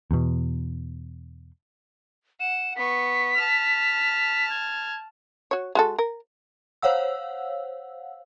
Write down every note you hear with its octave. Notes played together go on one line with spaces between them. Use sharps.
E2 B2
F#5 E7
B3 C#6 B6
A5 F6
G#6
F#4 C#5
G#3 F#4 A4
A#4
C5 C#5 F5 F#5 E6